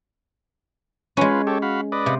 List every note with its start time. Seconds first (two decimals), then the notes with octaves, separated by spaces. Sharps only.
1.17 G#3 C#4 F4 B4
1.47 G4 A4 C#5
1.62 F#4 F5 B5
1.92 B4 D5 D#5
2.06 C3